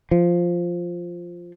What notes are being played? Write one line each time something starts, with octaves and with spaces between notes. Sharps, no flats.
F3